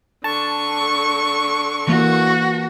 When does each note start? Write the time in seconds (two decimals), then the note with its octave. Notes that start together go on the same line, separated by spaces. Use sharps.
0.24 D3 A5 C#6
1.88 E3 A#3 F#4